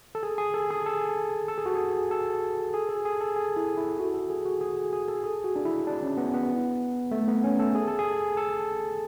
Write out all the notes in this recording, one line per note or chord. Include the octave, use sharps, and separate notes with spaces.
A4
G#4
G#4
A4
G#4
A4
A4
G#4
F#4
G#4
A4
G#4
A4
G#4
A4
G#4
E4
E4
F#4
A4
G#4
F#4
G#4
G#4
A4
G#4
F#4
D4
E4
D4
C#4
B3
B3
A3
B3
C#4
A4
G#4
A4
G#4
A4